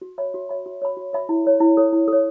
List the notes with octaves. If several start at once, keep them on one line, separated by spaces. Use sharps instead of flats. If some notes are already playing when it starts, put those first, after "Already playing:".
F#4
C#5 E5 B5
F#4
C#5 E5 B5
F#4
C#5 E5 B5
F#4
C#5 E5 B5
E4
A4 C#5
E4
A4 C#5
E4
A4 C#5